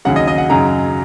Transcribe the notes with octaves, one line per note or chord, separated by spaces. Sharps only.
D#2 C#3 F#3 F#5
D#5
D#5
F#5
F#2 C#3 F#3 D#4 A#5